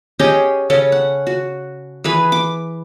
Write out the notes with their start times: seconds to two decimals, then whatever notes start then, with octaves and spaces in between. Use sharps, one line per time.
0.19 C#4 G4 G#4 D#5
0.70 C#3 C#4 A4
0.92 F#5
1.27 F#4
2.04 E3 G#4 B4
2.32 D6